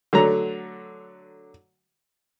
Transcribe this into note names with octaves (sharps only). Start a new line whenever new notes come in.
D3 F#3 A3 A#5